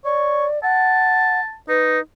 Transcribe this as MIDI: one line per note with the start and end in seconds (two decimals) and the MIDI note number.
0.05 0.46 73
0.05 0.61 74
0.63 1.40 78
0.63 1.56 81
1.69 1.99 63
1.69 2.00 71